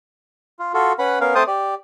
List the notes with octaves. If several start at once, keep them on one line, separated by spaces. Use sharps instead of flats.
F4
F4 F#4 A4
C#4 B4 F#5 B5
B3 C#4 A#4 F5
A3 C4 C5 G5 A5 D#6
G4 D5